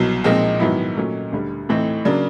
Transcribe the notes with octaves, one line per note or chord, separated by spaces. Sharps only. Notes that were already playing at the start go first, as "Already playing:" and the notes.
Already playing: C2 B2 F#3
A#2 F3 G#3 C4 D#4
G#2 D#3 F#3 B3 E4
A#2 F#3 A3 C#4
D2 D3 G3
A2 E3 A3 C4 D#4
C#3 F#3 A#3 D4